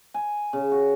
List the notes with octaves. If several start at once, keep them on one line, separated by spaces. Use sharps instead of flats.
G#5
C#3
F#4